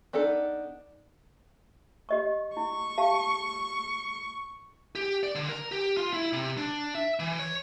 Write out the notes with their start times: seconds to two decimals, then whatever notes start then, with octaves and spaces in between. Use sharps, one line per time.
0.13 B3 D4 D#4 A4
2.09 G4 D#5 C#6
2.57 E4 C#6
2.98 G4 F5 A5
4.95 G4
5.23 D5
5.35 D3
5.49 A#4
5.72 G4
5.97 F4
6.13 E4
6.33 C3
6.57 D4
6.95 E5
7.19 E3
7.39 C#5